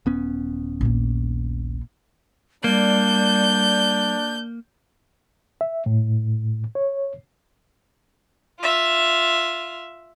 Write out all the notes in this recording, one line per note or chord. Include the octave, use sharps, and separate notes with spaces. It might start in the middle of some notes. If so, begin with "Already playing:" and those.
D#1 B3 C#4
A#1 A#3
G3 A#3 D4 G6
E5
A2
C#5
F4 E5